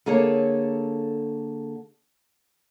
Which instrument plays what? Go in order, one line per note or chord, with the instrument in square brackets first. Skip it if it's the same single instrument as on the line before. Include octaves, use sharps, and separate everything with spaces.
[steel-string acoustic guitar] D3 A#3 G#4 A4 C#5